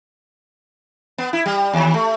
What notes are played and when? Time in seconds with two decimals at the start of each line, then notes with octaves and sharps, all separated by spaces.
1.18 B3
1.33 E4
1.46 G3
1.73 D#2
1.94 A3